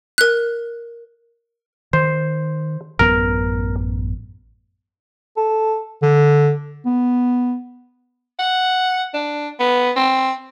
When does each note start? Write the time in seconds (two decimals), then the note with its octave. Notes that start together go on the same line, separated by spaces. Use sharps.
0.18 A#4 F#6
1.93 D#3 C5
2.99 A1 F#2 B3 A#4
5.37 A4
6.02 D3
6.86 B3
8.39 F#5
9.14 D4
9.59 B3
9.96 C4